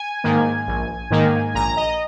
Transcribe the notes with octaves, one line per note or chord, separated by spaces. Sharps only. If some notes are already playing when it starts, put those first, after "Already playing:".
Already playing: G#5
G#2 D#3 A#3
A#1
G#2 D#3 A#3
A#1 A#5
D#5